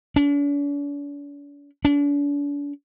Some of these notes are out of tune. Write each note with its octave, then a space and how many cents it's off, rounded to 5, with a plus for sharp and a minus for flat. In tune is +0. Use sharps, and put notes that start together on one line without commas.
D4 -45
D4 -40